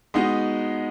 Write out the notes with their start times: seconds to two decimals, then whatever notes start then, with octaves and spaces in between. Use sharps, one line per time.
0.14 G#3 B3 D#4 F#4